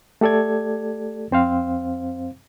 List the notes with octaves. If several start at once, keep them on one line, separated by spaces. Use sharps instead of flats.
A3 G4 A4 D5 G#6
F2 C4 C5 F5